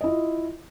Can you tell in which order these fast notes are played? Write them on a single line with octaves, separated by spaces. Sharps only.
D#5 E4 F4